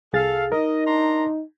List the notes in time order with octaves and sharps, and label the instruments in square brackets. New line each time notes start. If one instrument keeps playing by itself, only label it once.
[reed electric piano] C2 G#4 A6 [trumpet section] A4 F5
[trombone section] D#4 [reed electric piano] A#4 [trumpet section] D#5
[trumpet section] D4 A#5 C6